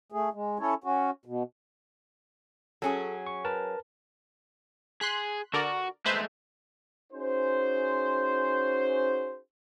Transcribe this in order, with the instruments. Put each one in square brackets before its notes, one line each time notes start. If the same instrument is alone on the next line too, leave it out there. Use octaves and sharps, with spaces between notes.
[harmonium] A3 G#4
G#3
C#4 E4 A4 C#5
C#4 F#4
B2
[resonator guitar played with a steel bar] F#3 C#4 G#4 [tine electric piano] A4
[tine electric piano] C#6
A#4 B4 A5
[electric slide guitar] G#4 [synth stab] C6 F#6 B6
[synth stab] D3 A#4 D5 [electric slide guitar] F#4
[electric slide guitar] G#3 A3 [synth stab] B4 C5 E5
[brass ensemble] C#4 D#4 F#4 G#4 C5